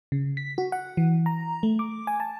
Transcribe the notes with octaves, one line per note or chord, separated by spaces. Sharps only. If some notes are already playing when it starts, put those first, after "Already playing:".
C#3
B6
F#4
F#5
E3
A#5
A3
D6
G#5
A5